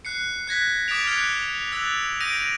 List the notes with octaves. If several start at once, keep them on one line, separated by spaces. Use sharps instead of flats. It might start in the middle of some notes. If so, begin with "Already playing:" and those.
F#6 C7 C#7
F#6 G#6 A#6 B6
D6 D#6 A6 B6 D7 F7
F6 F#6 G#6 B6 C#7
E6 F#6 A6 F7
D#6 G6 A#6 D7 D#7 F7